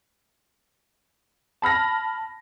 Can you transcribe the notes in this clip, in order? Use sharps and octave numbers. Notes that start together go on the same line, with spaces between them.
A5 B5 F6 A#6